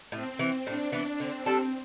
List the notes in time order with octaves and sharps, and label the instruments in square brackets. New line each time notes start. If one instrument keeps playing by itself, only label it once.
[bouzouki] A2 [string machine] C4
[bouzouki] E3 B3
[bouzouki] A2 [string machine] D4
[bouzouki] E3 B3
[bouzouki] D3 [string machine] C4
[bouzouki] G3 D4 A4